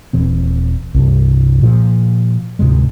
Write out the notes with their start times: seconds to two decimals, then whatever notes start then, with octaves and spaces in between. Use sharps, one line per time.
0.13 D#1 E3 C4
0.94 C2 G2
1.61 A#2 F3
2.59 D2 G#2 C3 G#3